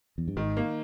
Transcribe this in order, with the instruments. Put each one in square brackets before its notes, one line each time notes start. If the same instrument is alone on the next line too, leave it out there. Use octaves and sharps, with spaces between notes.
[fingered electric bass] E2
G2
[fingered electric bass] G#1 G#2 [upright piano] D#3
[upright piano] A#3